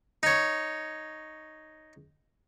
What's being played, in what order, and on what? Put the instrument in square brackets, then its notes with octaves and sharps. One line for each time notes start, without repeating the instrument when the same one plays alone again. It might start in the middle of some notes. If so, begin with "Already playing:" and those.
[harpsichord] D#4 C#5